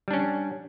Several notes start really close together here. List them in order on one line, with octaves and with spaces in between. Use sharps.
G3 D4 C#4